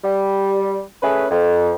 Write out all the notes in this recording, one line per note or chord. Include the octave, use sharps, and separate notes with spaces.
G3
A3 C#4 G#4 B4
F2